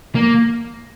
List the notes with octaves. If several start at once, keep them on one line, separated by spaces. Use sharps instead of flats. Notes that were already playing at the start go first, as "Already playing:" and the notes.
A#3